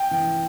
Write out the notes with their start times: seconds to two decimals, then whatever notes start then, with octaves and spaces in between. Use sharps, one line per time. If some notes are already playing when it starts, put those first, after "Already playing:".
Already playing: G5
0.11 E3